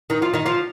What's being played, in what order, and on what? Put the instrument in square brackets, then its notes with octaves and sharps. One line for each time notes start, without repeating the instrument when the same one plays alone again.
[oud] D#3 D#4
F3 F4
D#3 D#4
F3 F4